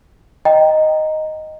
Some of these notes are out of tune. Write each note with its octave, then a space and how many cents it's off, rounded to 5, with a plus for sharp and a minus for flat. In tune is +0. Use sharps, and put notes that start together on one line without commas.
D#5 +0 G5 +0 A#5 +0